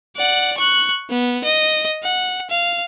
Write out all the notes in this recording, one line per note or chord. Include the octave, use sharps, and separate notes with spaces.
D5 F#5
C#6 F#6
B3
D#5
F#5
F5